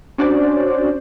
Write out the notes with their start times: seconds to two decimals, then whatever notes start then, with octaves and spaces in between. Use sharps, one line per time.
0.18 C#4 D4 F#4 C5 D5